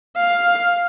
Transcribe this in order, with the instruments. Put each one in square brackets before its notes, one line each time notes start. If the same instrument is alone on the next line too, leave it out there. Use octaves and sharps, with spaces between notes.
[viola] F5